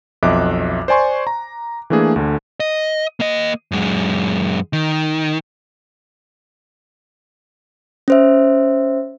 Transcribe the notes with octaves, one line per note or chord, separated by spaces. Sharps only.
B1 F2 D#5 E5 D6 F#6
C5 D5 G#5 C6 C#6
A#5
E3 A3 A#3 D4 G#4
D2 D3
D#5
A#3 D#5
F#2 G#3
D#3
C#4 C5 E5